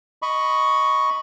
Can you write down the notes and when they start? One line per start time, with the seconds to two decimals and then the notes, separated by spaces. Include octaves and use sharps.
0.22 D#5 B5 C#6